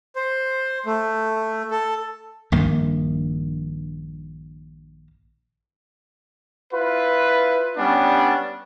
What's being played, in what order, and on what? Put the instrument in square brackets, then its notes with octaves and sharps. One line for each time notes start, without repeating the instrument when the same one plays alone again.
[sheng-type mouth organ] C5
A3
A4
[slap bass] A#1 G2 D#3 A#3
[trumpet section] E4 F4 B4
G3 B3 C#4 D4